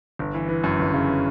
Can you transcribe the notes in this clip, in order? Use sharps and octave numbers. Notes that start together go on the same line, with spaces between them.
G1
E3
E3
F#2
G1
C#3